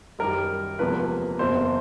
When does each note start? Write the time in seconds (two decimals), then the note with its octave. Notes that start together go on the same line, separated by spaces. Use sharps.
0.19 F#2 D#3 G3 A#4
0.79 E1 E2 C3 F3 A#3 B4
1.39 F#1 E2 B2 C5